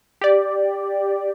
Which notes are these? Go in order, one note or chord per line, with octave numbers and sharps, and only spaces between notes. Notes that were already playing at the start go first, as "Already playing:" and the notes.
G4 D5